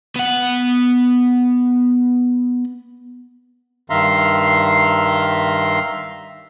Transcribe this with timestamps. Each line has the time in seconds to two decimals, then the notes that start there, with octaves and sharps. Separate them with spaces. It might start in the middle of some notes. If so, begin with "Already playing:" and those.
0.16 B3 F#5
3.90 G2 D#3 E5 F5 A#5 C6